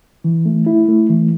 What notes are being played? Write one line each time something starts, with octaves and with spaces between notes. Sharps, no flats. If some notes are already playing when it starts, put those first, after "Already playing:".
E3
A3
E4
A3
E3